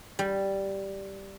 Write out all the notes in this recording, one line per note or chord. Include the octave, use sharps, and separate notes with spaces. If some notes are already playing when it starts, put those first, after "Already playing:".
G3